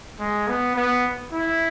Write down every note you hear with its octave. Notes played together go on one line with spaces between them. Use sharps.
G#3
B3
B3
E4